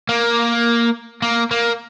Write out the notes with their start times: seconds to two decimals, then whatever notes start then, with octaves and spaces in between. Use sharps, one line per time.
0.09 A#3
1.22 A#3
1.51 A#3